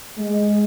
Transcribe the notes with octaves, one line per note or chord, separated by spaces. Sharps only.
G#3